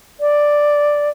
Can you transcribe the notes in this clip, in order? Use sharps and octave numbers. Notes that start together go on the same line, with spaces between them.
D5